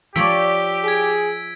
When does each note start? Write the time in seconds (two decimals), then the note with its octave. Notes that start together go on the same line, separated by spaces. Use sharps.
0.16 F3 G4 C#5 D5 E6 B6 D7
0.84 G#4 G#6 B6